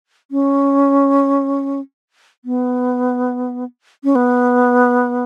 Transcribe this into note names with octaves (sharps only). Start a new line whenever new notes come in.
C#4
B3
C#4
B3